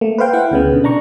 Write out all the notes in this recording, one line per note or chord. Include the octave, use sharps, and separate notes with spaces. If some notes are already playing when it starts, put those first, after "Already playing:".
A3 A#3
B4 C5 F5 G5
E4 F#5 G5
D2 C#3 B3
B2 D3
D4 A#5 C#6